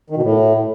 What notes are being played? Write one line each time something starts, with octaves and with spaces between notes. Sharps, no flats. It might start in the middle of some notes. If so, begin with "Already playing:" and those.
D#3
B2
A2